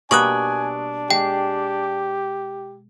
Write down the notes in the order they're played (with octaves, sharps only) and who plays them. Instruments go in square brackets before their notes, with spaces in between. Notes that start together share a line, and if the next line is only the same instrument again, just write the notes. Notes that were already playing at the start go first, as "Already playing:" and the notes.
[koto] B2 G3 A#3 [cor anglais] D4 [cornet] G#5 [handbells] C#6 D#6 F#6
[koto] G#3 [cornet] G4 [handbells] G5